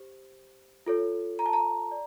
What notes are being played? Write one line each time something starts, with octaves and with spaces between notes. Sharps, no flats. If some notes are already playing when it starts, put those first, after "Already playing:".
Already playing: G4 C5
F4 A4 C#5
A#5
A5
A#5
D5